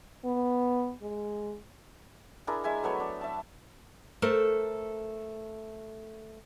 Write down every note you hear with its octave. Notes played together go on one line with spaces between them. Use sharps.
B3
G#3
D4 E4 G#4 A#4
G#3 E5 G#5 C6
F#3 A3 B3 C#5
D4
E5 A5
A3 A4 A#4 C5